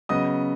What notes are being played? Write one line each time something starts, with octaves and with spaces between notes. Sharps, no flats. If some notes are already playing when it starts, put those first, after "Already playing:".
C#3 F#3 B3 D#5 D#6